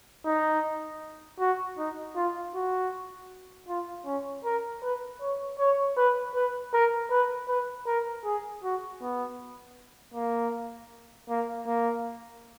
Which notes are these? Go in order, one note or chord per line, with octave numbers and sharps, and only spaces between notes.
D#4
F#4
D#4
F4
F#4
F4
C#4
A#4
B4
C#5
C#5
B4
B4
A#4
B4
B4
A#4
G#4
F#4
B3
A#3
A#3
A#3